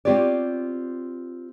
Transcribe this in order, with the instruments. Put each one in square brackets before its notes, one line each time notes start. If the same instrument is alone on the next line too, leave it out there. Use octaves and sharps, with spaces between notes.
[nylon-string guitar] C4 F4 G4 C#5 D5